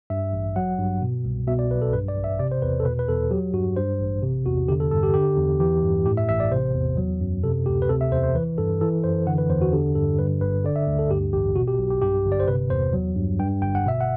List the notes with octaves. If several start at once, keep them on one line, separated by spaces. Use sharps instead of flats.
G2 E5
A1
F#3 F#5
G2
B2
C2
B2 E5
D5
B1 B4
A4
G2 B4
D5
A1
E5
C3 D5
C5
E2 B4
A4
B2 B4
B4
E2 A4
F#3 G4
G2 F#4
G2 C5
A1
C3
E2 F#4
D3 G4
A4
G2 A4
G4
D3 G4
E2
E3 G4
G2
A2 G4
E5
A1 E5
D5
C3 C5
E2
F#3
F#2
C3 A4
D2 G4
B4
C3 A4
E5
E2 C5
C5
E3 B4
G2 A4
E3 A4
F#2 C5
D3 F#5
B4
E2 C5
F#4
D3 G4
G2 A4
G2 B4
G1 B4
D3 D5
E5
D2
A4
G2 G4
A1 G4
B2 F#4
G4
B1
G4
G2 G4
G1
D5
C5
C3 B4
E2 C5
F#3
G2
G2 G5
G1 G5
F#5
B2 E5
F#5